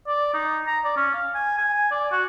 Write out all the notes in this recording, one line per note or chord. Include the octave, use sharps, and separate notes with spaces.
D5
D#4
A#5
D5
C#4
F5
G#5
G#5
G#5
D5
F#4